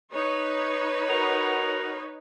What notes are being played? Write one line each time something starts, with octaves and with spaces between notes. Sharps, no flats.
D#4 B4 C#5
F#4 A#4 F#5